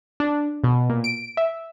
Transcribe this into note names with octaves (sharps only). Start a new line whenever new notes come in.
D4
B2
A#2
D7
E5